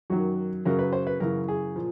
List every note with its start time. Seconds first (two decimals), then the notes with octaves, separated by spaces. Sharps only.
0.10 F#2 D#3 F#3 F#4
0.65 F#2 C#3 F#3 A#4
0.79 B4
0.93 C5
1.07 B4
1.20 F#2 C#3 E3 A#4
1.48 G#4
1.76 A#2 F3